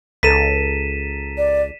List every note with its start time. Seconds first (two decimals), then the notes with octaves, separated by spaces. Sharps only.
0.23 C#2 A4 A#5 A6 B6 D#7 E7
1.38 D5